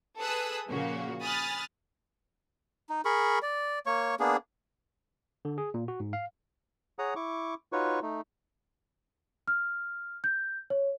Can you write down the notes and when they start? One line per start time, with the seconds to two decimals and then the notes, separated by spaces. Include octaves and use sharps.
0.20 G#4 A4 B4 D#6 E6 F#6
0.69 A#2 C#3 F3 A#3 F#4
1.21 G#5 B5 D#6 F6 F#6 A6
2.89 D#4
3.05 G#4 A#4 B5 C#6
3.42 D5
3.86 A#3 C#5 C#6
4.20 A#3 B3 D4 G#4
5.45 D3
5.58 G#4
5.74 A#2
5.88 F#4
6.00 G#2
6.13 F5
6.99 G#4 C#5 F#5 A#5 D#6
7.16 E4 C#6 D6
7.72 D#4 F4 F#4 B4 C#5 C#6
8.02 A3 D#4
9.48 F6
10.24 G6
10.70 C#5